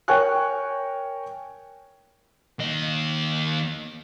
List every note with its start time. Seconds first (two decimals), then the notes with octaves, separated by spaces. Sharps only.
0.08 A#4 C#5 G5 G#5 C#6 F#6
2.59 D#2 D#5